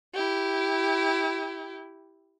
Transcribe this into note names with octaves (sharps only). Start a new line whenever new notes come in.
E4 G4